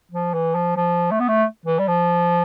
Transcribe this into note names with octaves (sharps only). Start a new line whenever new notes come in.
F3
E3
F3
F3
A3
B3
A3
E3
G3
F3